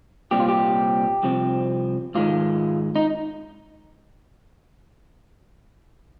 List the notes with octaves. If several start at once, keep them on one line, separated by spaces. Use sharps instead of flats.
C2 A#2 G3 C4 G4
F4
G4
C2 C3 F3 C4
G#2 D#3 G#3 F4
D#4